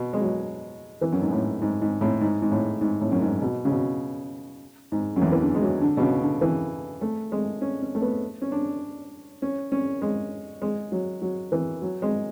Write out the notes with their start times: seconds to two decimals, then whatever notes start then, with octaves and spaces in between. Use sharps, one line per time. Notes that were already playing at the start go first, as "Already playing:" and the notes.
Already playing: B2
0.13 G#3
0.21 F#3
1.01 E3
1.12 F#2
1.22 G#2
1.31 A2
1.62 G#2
1.82 G#2
2.01 A2
2.21 G#2
2.42 G#2
2.52 A2
2.81 G#2
3.01 A2
3.12 F#2
3.22 G#2
3.42 B2
3.65 C#3
3.71 B2
4.92 G#2
5.16 F#2
5.22 E2
5.32 E3
5.42 D3
5.55 G#3
5.62 F#3
5.81 D3
5.97 B2
6.02 C#3
6.22 D3
6.41 E3
7.01 A3
7.32 G#3
7.61 C#4
7.82 C#4
7.95 A3
8.02 B3
8.42 C#4
8.52 D4
9.42 C#4
9.72 C#4
10.02 G#3
10.62 G#3
10.92 F#3
11.22 F#3
11.52 E3
11.82 F#3
12.02 G#3